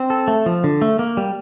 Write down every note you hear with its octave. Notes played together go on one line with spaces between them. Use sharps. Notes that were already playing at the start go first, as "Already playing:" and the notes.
Already playing: C4
A4
A3
F3
D3
A3
A#3
G3